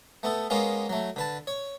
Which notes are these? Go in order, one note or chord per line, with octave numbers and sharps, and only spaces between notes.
A3 B3 A4
G#3 A#3 B3 C#4 F4
F#3 A3
D3 B4 A5
C#5